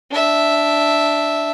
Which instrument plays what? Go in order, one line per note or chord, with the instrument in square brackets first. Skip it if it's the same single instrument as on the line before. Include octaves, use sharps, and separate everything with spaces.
[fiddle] D4 E5